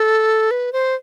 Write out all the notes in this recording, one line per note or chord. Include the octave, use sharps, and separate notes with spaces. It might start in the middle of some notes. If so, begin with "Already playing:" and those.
Already playing: A4
B4
C5